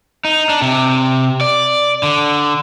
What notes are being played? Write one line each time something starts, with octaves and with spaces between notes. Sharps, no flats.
D#4
D4
C3
D5
D3